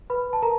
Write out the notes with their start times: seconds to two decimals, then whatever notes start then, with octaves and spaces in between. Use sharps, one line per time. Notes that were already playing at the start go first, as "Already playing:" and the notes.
0.10 B4 B5
0.33 A5
0.42 A#4 A#5